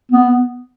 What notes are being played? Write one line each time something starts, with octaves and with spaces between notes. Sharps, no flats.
B3